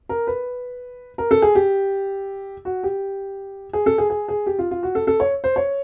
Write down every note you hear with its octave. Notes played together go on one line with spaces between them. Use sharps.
A#4
B4
A#4
A4
G#4
G4
F#4
G4
G#4
A4
G#4
G#4
G#4
G4
F4
F4
F#4
A4
A4
C#5
C5
C#5